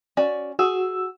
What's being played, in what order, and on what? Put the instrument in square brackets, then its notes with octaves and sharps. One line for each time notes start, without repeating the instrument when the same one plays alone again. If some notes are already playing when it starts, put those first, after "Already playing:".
[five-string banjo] C#4 F#4 D5
[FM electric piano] F#4 E6 [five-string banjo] G#4